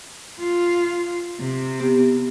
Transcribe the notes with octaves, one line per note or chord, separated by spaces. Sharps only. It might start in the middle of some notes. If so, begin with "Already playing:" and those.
F4
C3
B3 G4